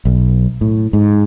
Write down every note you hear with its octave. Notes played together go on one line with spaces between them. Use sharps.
B1
A2
G#2